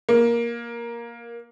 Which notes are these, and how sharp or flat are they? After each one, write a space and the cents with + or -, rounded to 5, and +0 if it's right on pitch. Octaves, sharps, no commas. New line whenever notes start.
A#3 +10